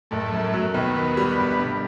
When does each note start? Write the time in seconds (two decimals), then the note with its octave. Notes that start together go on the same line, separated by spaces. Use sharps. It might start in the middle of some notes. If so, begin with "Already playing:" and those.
0.11 F#1 A2 A3
0.32 F#2
0.54 F#3
0.74 D#2 B2 B3
0.96 D#3
1.17 G3
1.38 G1
1.59 G2